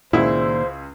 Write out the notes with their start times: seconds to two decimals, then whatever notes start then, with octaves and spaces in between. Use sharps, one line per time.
0.13 C#2 A#2 D#3 E4 F#4 G#4 C5 E6